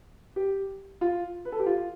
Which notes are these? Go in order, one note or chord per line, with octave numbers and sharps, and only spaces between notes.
G4
F4
B4
A4
G4
F4